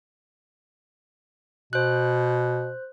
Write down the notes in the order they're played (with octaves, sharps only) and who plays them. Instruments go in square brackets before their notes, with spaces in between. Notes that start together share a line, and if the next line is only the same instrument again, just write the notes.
[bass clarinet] B2 [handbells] C5 F#6